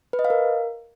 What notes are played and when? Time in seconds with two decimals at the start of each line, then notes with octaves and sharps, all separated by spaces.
0.13 B4
0.19 D#5
0.25 F5
0.30 A#4